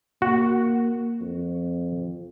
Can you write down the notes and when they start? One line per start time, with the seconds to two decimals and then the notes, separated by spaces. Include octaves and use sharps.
0.22 A#3 F#4
1.21 F2